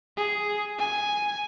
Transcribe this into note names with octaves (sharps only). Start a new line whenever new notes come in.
G#4
G#5